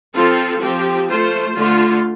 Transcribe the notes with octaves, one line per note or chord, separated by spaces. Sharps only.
F3 C4 F4 A4
F3 C4 G4
A3 F4 C5
D3 A3 F4